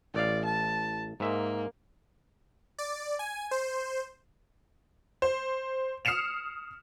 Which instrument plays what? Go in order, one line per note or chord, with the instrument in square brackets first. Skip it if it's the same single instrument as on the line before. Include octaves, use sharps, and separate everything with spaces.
[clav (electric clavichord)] A1 F5 [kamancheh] D5
[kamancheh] A5
[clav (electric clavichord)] G#2 E5 [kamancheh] A#3
[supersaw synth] D5
G#5
C5
[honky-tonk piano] C5
D#6 F6 C7 C#7 E7 F7